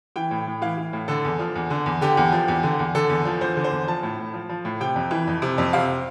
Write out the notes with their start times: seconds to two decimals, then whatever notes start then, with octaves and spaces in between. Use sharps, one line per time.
0.16 E3 G5
0.31 A2
0.47 A2
0.62 E3 F5
0.78 E3
0.93 A2
1.08 D3 A4
1.25 E2
1.39 F3
1.55 E2
1.70 D3
1.86 E2
2.01 D3 G4
2.17 E2
2.32 F3
2.48 E2
2.63 D3
2.79 E2
2.95 D3 A4
3.09 E2
3.25 F3
3.40 E2 C5
3.57 D3
3.64 C5
3.71 E2
3.88 F3 A5
4.03 A2
4.19 A2
4.33 F3
4.49 F3
4.65 A2
4.80 C3 G5
4.96 F2
5.11 E3
5.27 F2
5.42 C3
5.58 F2
5.73 C3 F5